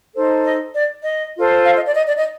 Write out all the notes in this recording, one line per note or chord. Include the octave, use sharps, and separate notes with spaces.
D#4 A4 C5
D#5
D5
D#5
F4 A4 C5
F5
D#5
D5
D#5
D5
D#5